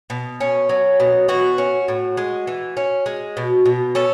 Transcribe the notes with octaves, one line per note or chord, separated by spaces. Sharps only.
B2
C#4
F#3
B2
E3 F#4
C#4
A2
G#3
E3
C#4
G#3
B2
B2
C#4 A4